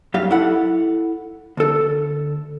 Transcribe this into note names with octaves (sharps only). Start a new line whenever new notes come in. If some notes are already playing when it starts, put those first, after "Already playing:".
F#2 G4 F5
E4 A4 F#5
D2 A4